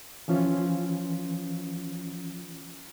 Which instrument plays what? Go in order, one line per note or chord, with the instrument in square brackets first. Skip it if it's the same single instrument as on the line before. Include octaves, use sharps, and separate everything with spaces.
[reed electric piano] E3 F3 C#4 F4